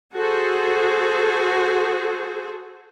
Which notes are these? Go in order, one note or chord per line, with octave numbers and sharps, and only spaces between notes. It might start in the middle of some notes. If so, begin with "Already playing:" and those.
F#4 G#4 A4 C5